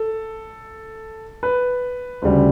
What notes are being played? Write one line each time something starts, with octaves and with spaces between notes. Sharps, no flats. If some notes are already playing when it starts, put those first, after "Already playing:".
Already playing: A4
B4
D2 C#3 G3